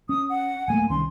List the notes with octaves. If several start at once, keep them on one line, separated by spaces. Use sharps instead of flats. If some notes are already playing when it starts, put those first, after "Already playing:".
C#4 D#6
F#5
D1 A3 A#3 G#5
C2 D#3 C#4 C6